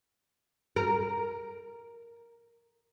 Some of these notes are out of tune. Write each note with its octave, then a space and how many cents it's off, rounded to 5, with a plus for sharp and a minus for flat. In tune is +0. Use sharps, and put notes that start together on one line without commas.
A#4 +5